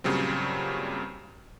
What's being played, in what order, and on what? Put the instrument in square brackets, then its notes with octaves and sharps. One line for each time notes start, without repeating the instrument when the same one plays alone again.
[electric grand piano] G2 A#2 C#3 F#3 G3 C4